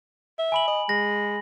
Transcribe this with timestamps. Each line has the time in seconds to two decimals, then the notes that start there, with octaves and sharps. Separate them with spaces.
0.39 E5
0.52 G#5 B5 F#7
0.68 D#5
0.89 G#3 A#6